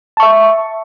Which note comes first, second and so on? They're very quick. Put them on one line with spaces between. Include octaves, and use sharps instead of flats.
A5 C#6 E5